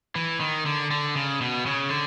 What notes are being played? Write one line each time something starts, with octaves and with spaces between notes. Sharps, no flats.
E3
D#3
D3
D3
C#3
B2
C#3
D3